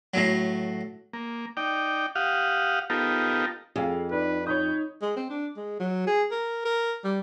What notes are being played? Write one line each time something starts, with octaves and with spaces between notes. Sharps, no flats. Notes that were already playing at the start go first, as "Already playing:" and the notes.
A2 F#3
A#3
D#4 D5 G5
G4 F5 F#5 D#6
B3 D#4 F4 G4 A4 A#4
F2 G#4 F5
D#4 B4 D5
D#4 C#5 B5 D#6 G6
G#3
C4
D4
G#3
F#3
G#4
A#4
A#4
G3